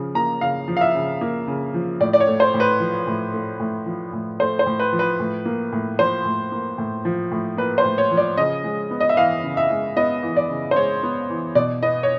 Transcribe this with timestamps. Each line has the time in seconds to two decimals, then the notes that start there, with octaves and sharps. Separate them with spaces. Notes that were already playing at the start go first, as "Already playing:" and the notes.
Already playing: C#3 F3
0.15 A#3 A#5
0.41 C#3 F5
0.68 F3
0.77 F5
0.81 E5
0.95 C#3
1.21 A#3
1.47 C#3
1.74 F3
2.00 A2 D5
2.13 D5
2.20 C#5
2.27 A3
2.40 C5
2.54 A2
2.60 B4
2.80 F3
3.07 A2
3.34 A3
3.60 A2
3.86 F3
4.13 A2
4.40 A3 C5
4.59 C5
4.66 A2
4.80 B4
4.93 F3
4.99 B4
5.20 A2
5.45 A#3
5.72 A2
5.99 F3 C5
6.25 A2
6.52 A#3
6.78 A2
7.05 F3
7.31 A2
7.57 A#3 B4
7.78 C5
7.85 A2
7.98 C#5
8.11 F3
8.17 D5
8.37 C#3 D#5
8.64 G#3
8.91 B3
9.00 D#5
9.09 E5
9.17 E3 F5
9.44 C#3
9.57 E5
9.70 G#3
9.96 B3 D#5
10.23 E3
10.37 D5
10.50 C#3
10.71 C5
10.76 G#3 C#5
11.03 B3
11.30 E3
11.55 B2 D5
11.82 B3 D#5
12.03 C#5